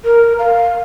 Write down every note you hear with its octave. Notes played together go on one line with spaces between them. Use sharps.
A#4
F5